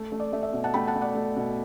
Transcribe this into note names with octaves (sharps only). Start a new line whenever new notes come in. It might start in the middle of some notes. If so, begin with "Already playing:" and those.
Already playing: A3
A3
D5
A3 E5
E5
B2
F#5 A5
A3 G5 B5
F#5 A5
A3
D5 F#5
A3
B2